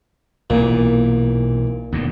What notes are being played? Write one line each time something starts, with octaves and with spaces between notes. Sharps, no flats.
B1 A#2 E3
D#2 B2 D3